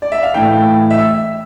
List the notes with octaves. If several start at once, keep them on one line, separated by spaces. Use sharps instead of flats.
D5
E5
F5
A2 E3 A3 G5
E5
E6